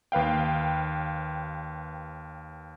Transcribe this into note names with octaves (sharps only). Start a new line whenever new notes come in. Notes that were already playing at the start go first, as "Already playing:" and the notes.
D#2 B4 F5 G5